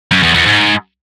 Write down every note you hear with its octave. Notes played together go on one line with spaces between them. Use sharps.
F#2
E2
E2
G#2